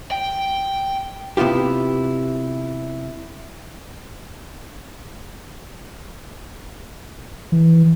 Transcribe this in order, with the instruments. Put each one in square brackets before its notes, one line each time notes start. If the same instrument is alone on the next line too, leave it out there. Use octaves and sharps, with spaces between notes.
[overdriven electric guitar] G5
[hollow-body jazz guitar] C3 B3 E4 F4 G4
[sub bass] E3